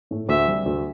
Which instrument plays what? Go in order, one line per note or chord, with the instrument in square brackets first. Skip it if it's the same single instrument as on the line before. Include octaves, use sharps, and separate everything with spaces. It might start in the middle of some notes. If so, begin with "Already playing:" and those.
[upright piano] A2 A3
[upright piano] D2 [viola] E5
[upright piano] C3 G3
D2